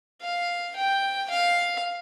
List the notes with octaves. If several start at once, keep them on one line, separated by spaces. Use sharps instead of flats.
F5
G5
F5